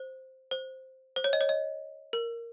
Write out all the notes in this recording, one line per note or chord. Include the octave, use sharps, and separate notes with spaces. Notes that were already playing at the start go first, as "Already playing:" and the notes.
Already playing: C5
C5
C5
C#5
D#5
C#5
D#5
A#4